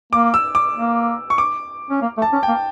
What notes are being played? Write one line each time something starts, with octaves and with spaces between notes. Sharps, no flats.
A#3 D6
E6
D6
A#3
C#6
D6
C#4
A#3
A3
A5
C#4
G5
A#3